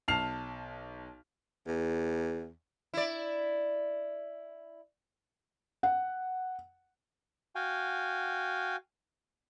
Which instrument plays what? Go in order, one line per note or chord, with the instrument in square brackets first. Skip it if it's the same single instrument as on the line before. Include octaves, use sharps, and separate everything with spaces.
[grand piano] B1 A5 F6 C7 F7
[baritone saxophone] E2
[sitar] E4 D5
[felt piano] F#5
[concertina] F#4 F5 G5 G#5